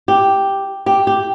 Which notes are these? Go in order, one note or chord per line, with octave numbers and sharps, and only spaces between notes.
G4
G4
G4